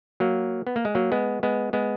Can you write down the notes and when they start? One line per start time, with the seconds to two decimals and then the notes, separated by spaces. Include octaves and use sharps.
0.20 F#3 A#3
0.67 B3
0.76 A#3
0.85 G#3
0.95 F#3 A#3
1.12 G#3 B3
1.43 G#3 B3
1.73 G#3 B3